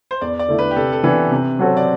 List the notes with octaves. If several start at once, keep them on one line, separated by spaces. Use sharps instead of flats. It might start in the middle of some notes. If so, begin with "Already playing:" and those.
C5
E2 D5
D5
D3 A3 E4
B4
G4
C3 A4
A4
E3 B3 D4 B4
C3
F#3 C4 F#4 A4
D5